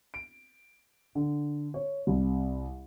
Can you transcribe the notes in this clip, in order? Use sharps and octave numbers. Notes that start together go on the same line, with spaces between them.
D7
D3
C#5
C2